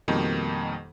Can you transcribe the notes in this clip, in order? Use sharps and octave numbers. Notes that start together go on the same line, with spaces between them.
F2 B2 D#3 G3 A#3 D#4